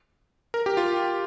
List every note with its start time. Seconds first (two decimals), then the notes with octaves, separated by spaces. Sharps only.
0.54 A#4
0.66 G4
0.77 F4